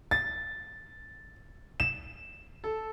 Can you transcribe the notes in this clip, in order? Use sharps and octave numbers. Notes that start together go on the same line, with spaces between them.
A6
E7
A4